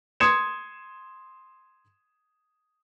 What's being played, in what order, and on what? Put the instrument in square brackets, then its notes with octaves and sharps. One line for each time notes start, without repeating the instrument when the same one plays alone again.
[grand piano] C6 D#6 G#6 C#7 E7